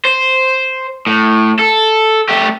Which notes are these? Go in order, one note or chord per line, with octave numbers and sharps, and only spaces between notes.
C5
A2
A4
A3 G4